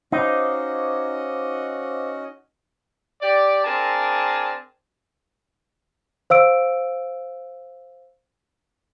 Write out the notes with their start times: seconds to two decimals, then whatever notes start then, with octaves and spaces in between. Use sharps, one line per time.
0.12 C#4 D#4 F#4 C5 D#5 F5 D6
3.21 G4 D5
3.65 C4 D4 G#4 A#4 A5
6.30 C5 F5 E6 D7